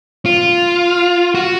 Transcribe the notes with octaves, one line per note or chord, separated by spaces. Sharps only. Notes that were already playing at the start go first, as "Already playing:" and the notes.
F4
F#4